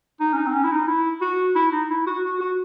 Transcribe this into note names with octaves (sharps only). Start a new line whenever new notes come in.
D#4
C#4
D#4
C4
C#4
E4
D#4
E4
F#4
E4
D#4
E4
F#4
F#4
F#4